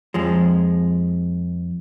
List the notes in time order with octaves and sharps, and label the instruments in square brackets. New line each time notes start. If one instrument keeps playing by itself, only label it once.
[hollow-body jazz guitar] F2 F3 G#3